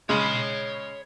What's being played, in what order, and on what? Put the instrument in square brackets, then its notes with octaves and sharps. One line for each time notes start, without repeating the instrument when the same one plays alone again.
[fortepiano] C#3 G#3 [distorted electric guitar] C#5 B5